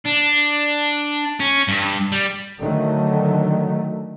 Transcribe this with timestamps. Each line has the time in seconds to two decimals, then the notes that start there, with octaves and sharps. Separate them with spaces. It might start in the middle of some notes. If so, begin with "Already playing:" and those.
0.05 D4
1.40 C#4
1.68 G2
2.12 G3
2.60 D3 D#3 F#3 A3